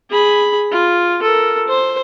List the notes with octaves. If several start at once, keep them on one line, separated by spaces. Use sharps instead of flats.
G#4 B5
F4
A4 A#4
C5